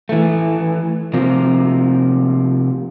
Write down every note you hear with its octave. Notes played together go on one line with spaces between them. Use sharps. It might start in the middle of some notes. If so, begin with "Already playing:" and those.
E3 A3
C3 F3 A#3